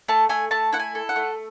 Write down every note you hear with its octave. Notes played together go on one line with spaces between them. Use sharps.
A3 A5
A3 G#5
A3 A5
E4 F#5
G#5
A4
F#5
A3